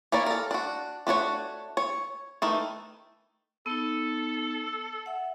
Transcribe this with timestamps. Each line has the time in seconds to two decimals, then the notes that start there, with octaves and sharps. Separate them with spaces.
0.12 A#3 E4 C#5 D5
0.26 A4 A#4
0.51 D4 F#4
1.07 A3 D4 F#4 C#5
1.77 C#5
2.42 D#3 E3 A3
3.66 B3 D#4 A4
5.06 E5 F#5